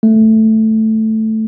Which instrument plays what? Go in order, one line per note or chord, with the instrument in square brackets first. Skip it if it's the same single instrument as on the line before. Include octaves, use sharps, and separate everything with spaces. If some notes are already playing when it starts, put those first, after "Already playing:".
[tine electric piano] A3